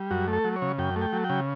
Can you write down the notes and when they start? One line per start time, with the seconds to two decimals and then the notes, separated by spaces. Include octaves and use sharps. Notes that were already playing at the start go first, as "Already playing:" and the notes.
Already playing: G3
0.11 F#2 F#4
0.28 A3
0.33 A4
0.44 F#3
0.56 C#5
0.62 C#3
0.78 F#2 G5
0.96 A3
1.02 G5
1.13 F#3
1.24 G5
1.30 C#3